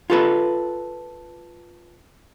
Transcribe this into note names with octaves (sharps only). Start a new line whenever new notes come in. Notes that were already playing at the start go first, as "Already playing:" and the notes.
F4 A4 B4